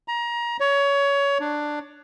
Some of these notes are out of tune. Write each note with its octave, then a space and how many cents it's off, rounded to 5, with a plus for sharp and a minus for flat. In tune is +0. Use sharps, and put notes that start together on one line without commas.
A#5 +25
C#5 +20
D4 +10